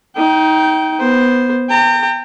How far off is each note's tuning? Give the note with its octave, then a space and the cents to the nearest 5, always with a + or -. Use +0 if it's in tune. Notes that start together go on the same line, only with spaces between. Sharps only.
D#4 +25 G5 -20
B3 -5 C5 +0
G5 +10 A#5 -35